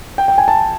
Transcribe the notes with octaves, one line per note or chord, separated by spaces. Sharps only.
G5
G5
G#5
A5